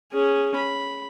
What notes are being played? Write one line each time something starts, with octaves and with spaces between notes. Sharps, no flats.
C#4 G#4
B5